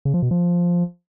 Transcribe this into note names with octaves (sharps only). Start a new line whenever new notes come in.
C#3
F3
B2
F3